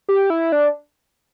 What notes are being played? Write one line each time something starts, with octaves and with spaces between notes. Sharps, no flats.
G4
E4
D4